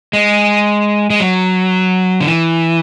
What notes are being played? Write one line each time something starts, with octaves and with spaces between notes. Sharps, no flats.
G#3
G#3
F#3
D3
E3